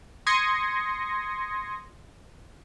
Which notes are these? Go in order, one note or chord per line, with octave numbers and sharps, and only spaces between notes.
C6 D#6 G#6 A#6 C#7